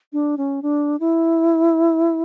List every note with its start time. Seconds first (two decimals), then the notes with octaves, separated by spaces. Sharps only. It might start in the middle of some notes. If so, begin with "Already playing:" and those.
0.13 D4
0.37 C#4
0.63 D4
1.00 E4